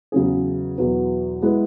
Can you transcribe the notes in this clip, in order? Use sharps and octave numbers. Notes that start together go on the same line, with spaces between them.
E2 C#3 F#3 C#4 G#4
E2 B2 F#3 B3
G#3 B3 E4 B4